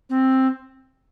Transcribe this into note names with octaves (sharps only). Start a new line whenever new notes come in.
C4